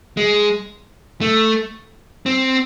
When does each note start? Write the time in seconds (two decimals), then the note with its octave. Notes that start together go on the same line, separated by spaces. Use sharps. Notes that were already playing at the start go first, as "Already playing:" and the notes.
0.17 G#3
1.21 A3
2.26 C4